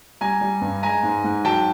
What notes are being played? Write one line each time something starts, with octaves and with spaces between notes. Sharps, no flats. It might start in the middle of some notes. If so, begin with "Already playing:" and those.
G3 G#5 A#5
G3
G2
G#3 G#5 A#5
G#2
G#2
F#3 G5 A5